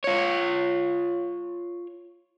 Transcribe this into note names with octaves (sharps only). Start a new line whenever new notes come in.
F4 C#5